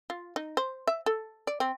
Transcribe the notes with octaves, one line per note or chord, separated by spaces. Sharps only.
F4
D#4
C5
E5
A4
D5
C4